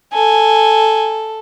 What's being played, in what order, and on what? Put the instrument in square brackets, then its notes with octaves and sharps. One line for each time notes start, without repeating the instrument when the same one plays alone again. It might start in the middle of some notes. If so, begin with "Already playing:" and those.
[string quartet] A4 [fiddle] G#5